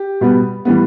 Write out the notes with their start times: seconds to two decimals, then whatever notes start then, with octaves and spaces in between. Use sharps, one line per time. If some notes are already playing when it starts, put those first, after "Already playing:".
Already playing: G4
0.21 B2 G3 B3
0.65 A2 E3 G3 B3